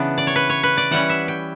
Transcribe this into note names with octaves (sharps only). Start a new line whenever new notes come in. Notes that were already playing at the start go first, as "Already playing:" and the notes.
Already playing: C#3 E3 B3 D4
D5
C#5
B4
C#5
B4
D5
E3 G3 C#4 F#5
E5
G5